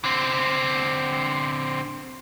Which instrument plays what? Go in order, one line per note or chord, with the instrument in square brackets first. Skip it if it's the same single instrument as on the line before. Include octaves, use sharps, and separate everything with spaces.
[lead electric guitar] D3 C4